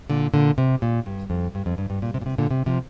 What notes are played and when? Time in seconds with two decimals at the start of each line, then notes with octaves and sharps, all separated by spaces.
0.10 A#2 D3
0.34 A#2 D3
0.58 C3
0.82 A#2
1.06 G2
1.30 F2
1.55 G2
1.66 F2
1.78 G2
1.90 G2
2.02 A#2
2.14 C3
2.22 A#2
2.26 C3
2.38 A#2 D3
2.51 C3
2.66 C3 F3